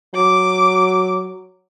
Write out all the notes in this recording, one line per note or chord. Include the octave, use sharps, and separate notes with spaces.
F#3 D6